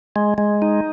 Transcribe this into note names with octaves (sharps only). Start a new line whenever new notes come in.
G#3
G#3
D#4